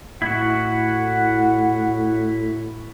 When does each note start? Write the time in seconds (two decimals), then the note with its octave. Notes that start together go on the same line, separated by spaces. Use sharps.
0.22 A2 E4 F#4 F#5